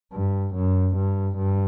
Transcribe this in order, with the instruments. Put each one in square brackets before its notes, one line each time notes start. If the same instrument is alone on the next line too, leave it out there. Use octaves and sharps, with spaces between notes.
[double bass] G2
F#2
G2
G2